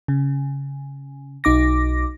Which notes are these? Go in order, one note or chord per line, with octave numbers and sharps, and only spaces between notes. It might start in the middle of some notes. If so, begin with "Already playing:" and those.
C#3
B1 D#4 D6 A#6